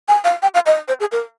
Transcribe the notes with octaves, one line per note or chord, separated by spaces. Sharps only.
G#5
F5
G5
F5
D#5
C5
G#4
A#4